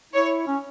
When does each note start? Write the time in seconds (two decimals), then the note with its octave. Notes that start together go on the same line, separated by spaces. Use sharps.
0.13 E4 C#5
0.48 C#4